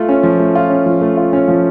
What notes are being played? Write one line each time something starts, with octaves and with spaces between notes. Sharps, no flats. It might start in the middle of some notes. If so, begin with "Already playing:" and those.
Already playing: A3 F4
C#4
F3
A3
F4
C#4
F3
A3
F4
C#4
F3